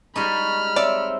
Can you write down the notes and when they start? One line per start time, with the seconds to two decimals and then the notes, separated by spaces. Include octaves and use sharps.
0.16 G3 G#3 D#4 B5 C#6 F6
0.76 C4 C#5 D5 E5 E6